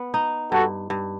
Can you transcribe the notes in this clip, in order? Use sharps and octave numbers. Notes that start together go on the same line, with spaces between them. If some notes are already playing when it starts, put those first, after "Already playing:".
Already playing: B3
D#4
G2 F#4 A4
G2